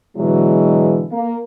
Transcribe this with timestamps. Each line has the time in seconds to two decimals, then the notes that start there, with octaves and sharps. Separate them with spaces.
0.17 B2 D3 E3 F#3 G#3
1.11 A#3